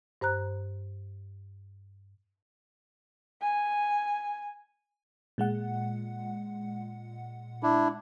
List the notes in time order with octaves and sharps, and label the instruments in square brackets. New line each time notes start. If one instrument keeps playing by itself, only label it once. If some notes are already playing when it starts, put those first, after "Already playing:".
[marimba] G2 C5 A#5 F#6
[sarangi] G#5
[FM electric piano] A#2 G#3 F#5
[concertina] D4 E4